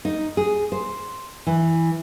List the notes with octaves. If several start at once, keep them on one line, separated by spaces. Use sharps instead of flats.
D#4
G#4
C5
E3